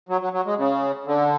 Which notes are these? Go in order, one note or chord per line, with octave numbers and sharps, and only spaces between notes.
F#3
F#3
F#3
G#3
C#3
D3